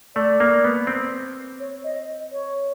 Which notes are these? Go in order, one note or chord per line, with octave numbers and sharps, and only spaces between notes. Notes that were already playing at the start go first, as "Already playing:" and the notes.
A3 D5
A#3
B3
C4
C#5
D#5
C#5